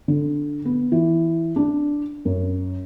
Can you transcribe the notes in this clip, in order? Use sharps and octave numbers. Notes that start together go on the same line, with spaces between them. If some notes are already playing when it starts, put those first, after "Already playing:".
D3
B3
E3
D4
F#2